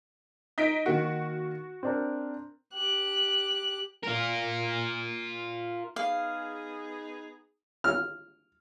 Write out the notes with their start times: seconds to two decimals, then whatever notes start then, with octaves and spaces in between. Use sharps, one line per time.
0.58 D#4 B6 D7
0.86 D#3 A#3 F#4
1.83 C4 D4 A#4
2.73 G4 F#6
4.03 F4 A#4
5.96 B3 D#4 G#4 F5
7.84 F6